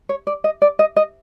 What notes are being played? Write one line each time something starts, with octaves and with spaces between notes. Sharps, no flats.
C#5
D5
D#5
D5
D#5
D#5